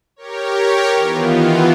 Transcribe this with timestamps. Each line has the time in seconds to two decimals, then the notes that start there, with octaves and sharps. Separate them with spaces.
0.16 G4 A#4 C#5
0.97 D#3 E3 B3 F4